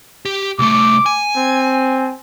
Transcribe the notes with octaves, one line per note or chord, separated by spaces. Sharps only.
G4
C2 A3 D6
G#5
C4